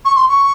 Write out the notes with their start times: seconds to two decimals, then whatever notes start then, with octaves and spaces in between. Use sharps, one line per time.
0.05 C#6
0.16 C6
0.28 C#6